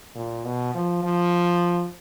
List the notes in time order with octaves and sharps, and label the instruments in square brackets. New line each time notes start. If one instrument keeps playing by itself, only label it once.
[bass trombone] A#2
B2
F3
F3